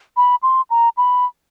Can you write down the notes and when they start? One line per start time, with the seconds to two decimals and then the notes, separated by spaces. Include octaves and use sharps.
0.17 B5
0.43 C6
0.70 A#5
0.97 B5